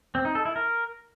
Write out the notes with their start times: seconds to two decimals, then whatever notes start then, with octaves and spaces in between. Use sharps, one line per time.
0.15 C4
0.25 D#4
0.35 A4
0.45 E4
0.56 A#4